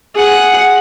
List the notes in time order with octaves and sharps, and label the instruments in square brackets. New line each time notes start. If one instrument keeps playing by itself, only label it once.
[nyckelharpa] G#4 F#5